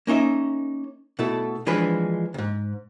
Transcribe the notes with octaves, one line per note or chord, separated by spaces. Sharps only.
A#3 C#4 D#4 E5
B2 A3 E4 A4
E3 F3 G#3 D4 B4
D2 G#2